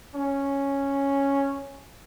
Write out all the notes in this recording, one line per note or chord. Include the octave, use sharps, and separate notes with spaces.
C#4